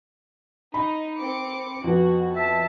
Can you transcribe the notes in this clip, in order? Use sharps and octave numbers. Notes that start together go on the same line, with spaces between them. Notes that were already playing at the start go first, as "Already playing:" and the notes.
D#4 B5
C4 D6 C#7
F2 B3 F#4
E5 A5